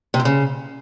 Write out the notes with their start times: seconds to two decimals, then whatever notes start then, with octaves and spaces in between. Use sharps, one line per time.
0.14 C3
0.20 G#2
0.25 C#3